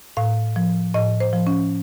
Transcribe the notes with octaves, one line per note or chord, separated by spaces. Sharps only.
A2 F5
F3
A2 D#5
C5
F3
C#4